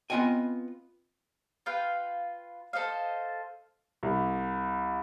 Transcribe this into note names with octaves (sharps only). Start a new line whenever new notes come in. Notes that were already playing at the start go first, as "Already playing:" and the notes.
B3 C4 F4 D#5 G5 G#5
F4 B4 F5 G5
A4 C5 D#5 F5
C2